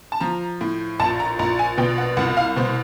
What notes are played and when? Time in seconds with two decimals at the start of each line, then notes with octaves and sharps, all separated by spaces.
0.12 A5
0.20 F3 A#5
0.61 A2
1.00 A#1 A5
1.20 A#5
1.39 A#1 A#5
1.59 G#5
1.78 B2 G5
1.98 F#5
2.17 C2 F#5
2.37 F5
2.56 B2 C5